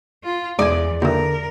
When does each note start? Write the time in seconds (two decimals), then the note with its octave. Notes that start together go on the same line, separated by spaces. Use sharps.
0.24 F4
0.59 E2 G#2 D5 G#5
1.02 D#2 D3 E3 A#4